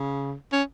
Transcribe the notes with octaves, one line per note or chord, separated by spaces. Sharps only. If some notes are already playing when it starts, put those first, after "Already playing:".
Already playing: C#3
C#4